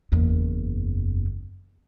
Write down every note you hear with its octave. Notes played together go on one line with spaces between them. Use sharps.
F#1 E2